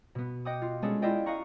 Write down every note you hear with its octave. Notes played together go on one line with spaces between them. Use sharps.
B2 B3
D#5 F#5 G5 D6 D#6
F4
G#3 B3 C#4 D4 G#4 A4
E4 F4 D5 D#5 G5
D#5 F5 F#5 A#5 C#6